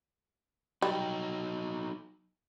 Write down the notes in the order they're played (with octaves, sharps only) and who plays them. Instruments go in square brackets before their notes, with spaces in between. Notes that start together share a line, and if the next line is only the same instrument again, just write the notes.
[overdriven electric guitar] F#3 D#4 [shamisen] G3